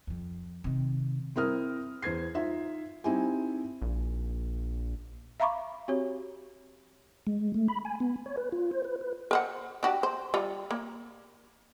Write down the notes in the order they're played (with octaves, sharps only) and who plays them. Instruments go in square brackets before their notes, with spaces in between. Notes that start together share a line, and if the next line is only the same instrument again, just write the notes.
[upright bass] F2 F3
C3 D#3
[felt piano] C4 E4 A#4 D#6 F6
E2 C5 G#6 C7
D#4 F4 E5
C4 D#4 E4 G4 G#5
[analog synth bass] A#1
[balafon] E5 F5 A#5 B5 C#6 D6
C4 F#4 G4 C#5
[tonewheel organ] G#3
A3
B5
G#5
B3
C#5
B4
F4
C5
B4
B4
[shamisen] A#4 C5 F#5
D4 F#4 G4
C5
G3 F4
A#3